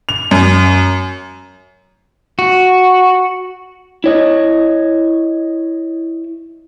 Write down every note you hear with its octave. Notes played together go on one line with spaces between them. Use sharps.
F7
F#2
F#4
E4 C#5 D#5